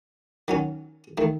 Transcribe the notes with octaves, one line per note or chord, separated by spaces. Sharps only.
D#3 F#3 C#4
D#3 A3